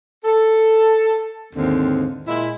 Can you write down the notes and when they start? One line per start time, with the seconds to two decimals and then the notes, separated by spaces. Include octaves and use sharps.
0.25 A4
1.55 D#2 G#2 D3 C4
2.28 A#2 G#3 E4